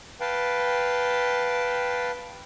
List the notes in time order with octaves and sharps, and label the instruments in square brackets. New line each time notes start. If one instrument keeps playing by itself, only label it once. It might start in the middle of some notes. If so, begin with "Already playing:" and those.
[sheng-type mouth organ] B4 F5 G5 A5